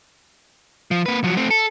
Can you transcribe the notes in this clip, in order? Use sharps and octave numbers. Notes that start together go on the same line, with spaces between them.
F3
A#3 B4
F3 F#3
A3 C4
A4